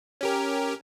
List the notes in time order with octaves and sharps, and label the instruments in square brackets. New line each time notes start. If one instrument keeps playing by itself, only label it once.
[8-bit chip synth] C#4 G4 A#4